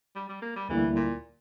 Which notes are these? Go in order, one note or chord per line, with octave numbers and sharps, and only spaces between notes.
G3
G3
A#3
G3
D2 D3 E3 G3 A#3 E4
A#2